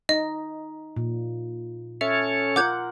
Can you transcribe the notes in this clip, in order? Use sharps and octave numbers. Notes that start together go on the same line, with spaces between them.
D#4 D#5
A#2
C#4 A4 C#5 E5
F4 A#4 F#5 D6 G6 G#6